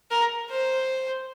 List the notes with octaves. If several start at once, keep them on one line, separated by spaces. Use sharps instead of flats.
A#4
C5